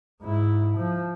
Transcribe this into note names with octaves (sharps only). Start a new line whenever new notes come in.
G#2 E4
F3